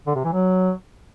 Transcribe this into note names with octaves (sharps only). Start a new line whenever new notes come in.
D3
C3
E3
F#3